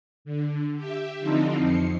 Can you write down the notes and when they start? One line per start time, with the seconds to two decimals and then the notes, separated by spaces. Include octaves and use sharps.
0.25 D3
0.76 G4 E5
1.19 D3 E3 F3 C4 D#4
1.59 F2 C7 C#7